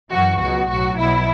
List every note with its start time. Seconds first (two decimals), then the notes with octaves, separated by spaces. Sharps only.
0.11 F#2 E3 F#4
0.40 C#2 B2 F#3 F#4
0.69 B1 A2 F#3 F#4
0.97 B1 B2 F#3 E4